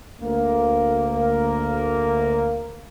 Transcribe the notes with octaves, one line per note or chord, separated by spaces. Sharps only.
D2 A#3